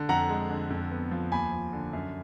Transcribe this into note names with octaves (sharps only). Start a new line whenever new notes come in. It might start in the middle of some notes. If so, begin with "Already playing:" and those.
Already playing: D3
F2 F#5 A#5
G#3
D3
F2
B3
F3
D#2 G#5 B5
F3
D3
F#2